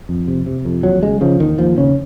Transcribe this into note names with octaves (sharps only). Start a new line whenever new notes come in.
F2
C3
C3
F2
D#2 F#3
C#3 G#3
C#3 F3
D#2 D#3
D#2 F3
C#3 C#4